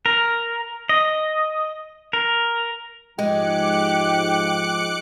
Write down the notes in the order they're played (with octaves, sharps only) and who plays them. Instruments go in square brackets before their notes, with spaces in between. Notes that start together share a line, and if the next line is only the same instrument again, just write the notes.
[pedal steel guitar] A#4
D#5
A#4
[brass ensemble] G#2 F3 [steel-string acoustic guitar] G#3 [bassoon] G4 [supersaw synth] D6 F#6 C#7